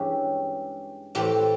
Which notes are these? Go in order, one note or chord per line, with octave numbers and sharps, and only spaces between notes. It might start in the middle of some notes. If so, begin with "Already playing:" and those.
Already playing: G2 E3 G#3 C#4 G4
A2 E3 A3 C4 G4